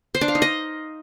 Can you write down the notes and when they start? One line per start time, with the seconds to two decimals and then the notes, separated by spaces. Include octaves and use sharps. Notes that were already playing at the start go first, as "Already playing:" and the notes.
0.14 C5
0.21 D4
0.28 F5
0.35 D#4
0.42 D#5